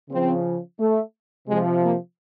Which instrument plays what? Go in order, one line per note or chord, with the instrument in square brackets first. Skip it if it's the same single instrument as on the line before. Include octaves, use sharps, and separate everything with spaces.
[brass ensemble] C#3 F3 C4
A3
C3 F3 G#3
A#3